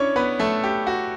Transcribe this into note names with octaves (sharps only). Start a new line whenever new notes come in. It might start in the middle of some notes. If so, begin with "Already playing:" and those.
Already playing: C#4 D4 E4 C#5
B3 B4
A3 A4
G4
F#4